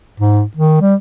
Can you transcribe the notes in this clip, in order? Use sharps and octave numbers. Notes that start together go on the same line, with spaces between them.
G#2
D#3
G3